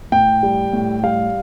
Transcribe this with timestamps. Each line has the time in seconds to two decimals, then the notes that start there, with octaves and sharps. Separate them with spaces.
0.12 A2 G5
0.43 G3
0.73 A2
1.03 G3 F5